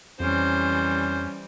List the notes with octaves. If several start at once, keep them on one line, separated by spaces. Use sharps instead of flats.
F2 E3 G3 C#4 C5